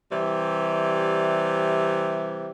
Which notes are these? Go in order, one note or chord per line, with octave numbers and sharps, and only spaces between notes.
C3 E3 G3